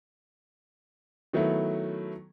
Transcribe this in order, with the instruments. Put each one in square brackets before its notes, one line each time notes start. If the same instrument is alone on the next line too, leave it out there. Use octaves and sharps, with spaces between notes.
[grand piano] D#3 F#3 A3 B3 E4 A4